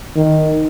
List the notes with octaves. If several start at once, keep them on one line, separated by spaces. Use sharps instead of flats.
D#3